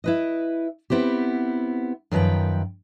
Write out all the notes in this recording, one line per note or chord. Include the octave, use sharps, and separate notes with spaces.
E4 B4 D#5
B3 C4 E4 G4
F#2 D#3 F3 B4 G5